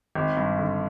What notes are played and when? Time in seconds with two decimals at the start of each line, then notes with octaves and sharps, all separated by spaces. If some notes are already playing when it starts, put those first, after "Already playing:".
0.15 G#1
0.37 G2
0.58 D3